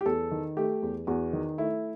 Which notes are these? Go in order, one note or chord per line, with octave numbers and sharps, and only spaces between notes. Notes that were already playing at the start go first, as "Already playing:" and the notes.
G4
E2 A4
D#3
A3 G4
E2
E2 F#4
D#3
A3 E4